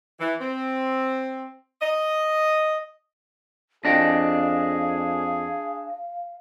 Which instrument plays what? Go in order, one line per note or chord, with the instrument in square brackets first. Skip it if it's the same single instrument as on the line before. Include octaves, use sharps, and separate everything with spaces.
[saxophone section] E3
C4
D#5
[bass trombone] F2 [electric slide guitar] D4 D#5 G5 [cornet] G#4 [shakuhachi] F5